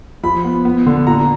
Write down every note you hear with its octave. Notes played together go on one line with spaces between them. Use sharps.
F3 B5
B3
B3
D3
A#2 A#5